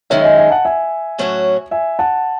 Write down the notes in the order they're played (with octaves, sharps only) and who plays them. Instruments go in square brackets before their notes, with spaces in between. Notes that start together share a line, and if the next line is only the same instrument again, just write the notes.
[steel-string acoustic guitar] F#2 D#3 G#3 D#4 [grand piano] C#5 E5
[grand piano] E5 G#5
E5 G#5
F#5 A5
E5 G#5
[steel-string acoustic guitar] A2 F#3 C#4 F#4 C#5
[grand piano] E5 G#5
F#5 A5